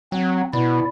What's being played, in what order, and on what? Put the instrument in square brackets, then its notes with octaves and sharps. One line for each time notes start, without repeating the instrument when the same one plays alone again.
[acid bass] F#3 [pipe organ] C4
[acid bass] B2 [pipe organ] E4 D5